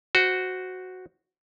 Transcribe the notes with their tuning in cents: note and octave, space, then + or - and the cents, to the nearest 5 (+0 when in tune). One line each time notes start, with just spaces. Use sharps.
F#4 +0 C5 -15